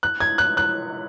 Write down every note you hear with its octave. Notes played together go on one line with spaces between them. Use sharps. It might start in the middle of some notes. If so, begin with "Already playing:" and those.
F#6
G#6
F#6
F#6